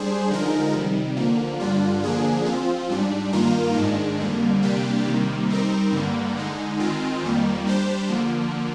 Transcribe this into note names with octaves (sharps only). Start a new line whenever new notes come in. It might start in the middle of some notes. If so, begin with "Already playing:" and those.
Already playing: G3 D4 G#4 C5
D3 F3 G#3 D#4 A#4
C3 D#3 G3
D3 F3 A#3
G2 D3 G3 D4 F4
D3 F3 A#3 D4 G#4
F3 C4 F4
G#2 G3 D4
G2 D#3 A#3 F4 A#4
G#2 D#3 G#3 D4
F2 D3 G3 A#3
C3 G3 A#3 D4 G4
C3 D#3 G3 A#3
G3 C4 D#4 A#4
G2 D3 G3 A#3
D3 G#3 D#4
D#3 G#3 C4 F4
F2 D#3 G3 A#3
G3 D4 G4 C5
D3 F3 A#3